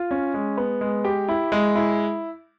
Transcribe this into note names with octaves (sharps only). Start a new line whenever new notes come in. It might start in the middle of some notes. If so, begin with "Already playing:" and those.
Already playing: F4
C#4
G#3
B3
G#3
G4
E4
G#3
E4